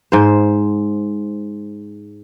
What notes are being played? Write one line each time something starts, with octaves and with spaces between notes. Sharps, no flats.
G#2 C5